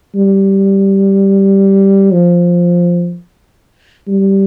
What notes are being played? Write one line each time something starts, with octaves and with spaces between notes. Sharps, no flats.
G3
F3
G3